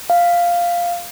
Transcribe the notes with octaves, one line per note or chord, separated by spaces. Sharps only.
F5